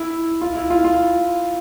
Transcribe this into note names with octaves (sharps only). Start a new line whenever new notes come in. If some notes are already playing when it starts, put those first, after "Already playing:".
Already playing: E4
F4
E4
F4
F4